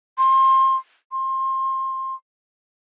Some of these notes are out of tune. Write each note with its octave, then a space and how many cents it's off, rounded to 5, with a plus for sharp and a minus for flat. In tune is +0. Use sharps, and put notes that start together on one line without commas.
C6 +25
C6 +25